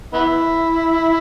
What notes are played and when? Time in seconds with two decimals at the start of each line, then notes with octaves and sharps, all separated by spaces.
0.13 B3 E4